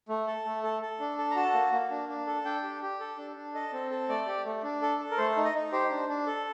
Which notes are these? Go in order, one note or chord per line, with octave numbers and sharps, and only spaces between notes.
A3
A4
A3
A4
A4
D4
A4
A#5
F#4 A5
A#3
A#3
D4
D4
A4
D4 G5
G4
G4
A4
D4
D4
A4 D#5
C4
A4
A3 D5
G4
A3
D4
A4
A4
A#4
A3 C5
D#4
D#5
D#4
G4 C5
D4
D4
A4